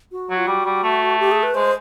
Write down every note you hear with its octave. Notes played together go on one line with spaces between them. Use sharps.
F#4
F#3
F4
G3 F#4
G3
A3
G4
G#4
B4
G#3 C5